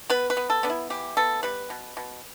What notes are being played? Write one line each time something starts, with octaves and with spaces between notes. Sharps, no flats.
B3 B4
B4
B3
A4
B3 D4
E4
E3 G4
B3 A4
G3 B4
B2
B2